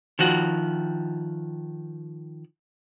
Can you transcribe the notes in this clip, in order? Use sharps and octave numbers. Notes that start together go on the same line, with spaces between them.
D#3 F3 F#4